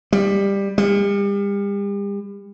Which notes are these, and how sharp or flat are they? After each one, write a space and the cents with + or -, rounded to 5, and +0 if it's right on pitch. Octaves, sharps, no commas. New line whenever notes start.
G3 +15
G3 +40